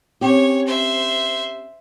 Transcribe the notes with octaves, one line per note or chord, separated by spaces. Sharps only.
C4 C#4 G4 C#5
C5 E5